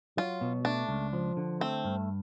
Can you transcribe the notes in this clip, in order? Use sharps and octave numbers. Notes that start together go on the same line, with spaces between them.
F#3 F4
B2
A3 D4
C#2
F3
D3
A3 C4
G2